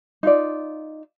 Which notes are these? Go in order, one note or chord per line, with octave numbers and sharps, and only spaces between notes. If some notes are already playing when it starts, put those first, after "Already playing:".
D#4 F4 D5